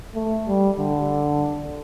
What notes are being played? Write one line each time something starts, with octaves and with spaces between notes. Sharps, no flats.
A3
G3
D3